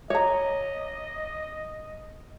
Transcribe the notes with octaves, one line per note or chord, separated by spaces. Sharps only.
C#5 D#5 A#5